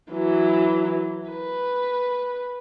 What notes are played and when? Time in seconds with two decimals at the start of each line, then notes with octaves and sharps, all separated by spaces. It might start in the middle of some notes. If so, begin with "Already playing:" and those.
0.11 E3 F#3
1.30 B4